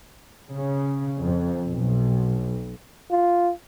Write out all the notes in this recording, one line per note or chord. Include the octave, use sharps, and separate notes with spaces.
C#3
F2
B1
F4